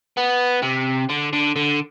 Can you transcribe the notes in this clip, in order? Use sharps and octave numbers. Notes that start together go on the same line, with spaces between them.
B3
C3
D3
D3
D3